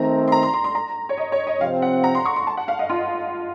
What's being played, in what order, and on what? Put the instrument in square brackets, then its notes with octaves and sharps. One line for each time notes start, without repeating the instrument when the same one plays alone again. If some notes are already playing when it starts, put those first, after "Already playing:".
Already playing: [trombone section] D#3 A3 C4 [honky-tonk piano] A#5
[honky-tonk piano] C6
A#5
C6
C6
C6
A#5
C#5
D#5
C#5
D#5
[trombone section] C3 F3 C4 [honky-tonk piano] F5
[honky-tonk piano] F#5
A#5
C6
C#6
C6
A5
F#5
F5
D#5
F4